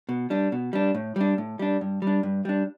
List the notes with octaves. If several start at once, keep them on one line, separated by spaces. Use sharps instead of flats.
B2
G3 D4
B2
G3 D4
A2
G3 D4
A2
G3 D4
G2
G3
D4
G2
G3 D4